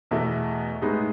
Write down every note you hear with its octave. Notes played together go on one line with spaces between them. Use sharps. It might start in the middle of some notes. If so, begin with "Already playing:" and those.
E2 B2 A3 E4
A2 G#3 B3 D#4